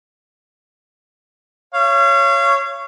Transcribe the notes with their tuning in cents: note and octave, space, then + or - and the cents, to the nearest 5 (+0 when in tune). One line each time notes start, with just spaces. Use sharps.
C#5 +0 F5 -35